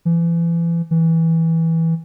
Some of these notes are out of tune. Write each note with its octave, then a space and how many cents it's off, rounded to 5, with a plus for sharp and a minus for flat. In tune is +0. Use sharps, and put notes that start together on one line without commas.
E3 +35
E3 -10